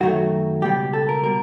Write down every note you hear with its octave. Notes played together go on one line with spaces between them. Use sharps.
F#2 D#3 F#3 A3 F#4
C#2 B2 G3 G4
A4
A#4
B2 G3 A#4